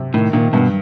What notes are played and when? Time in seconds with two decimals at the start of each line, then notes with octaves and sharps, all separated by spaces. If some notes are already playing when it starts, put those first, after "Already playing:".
Already playing: C3
0.14 A2 D#3
0.33 A#2 D#3
0.53 G2 B2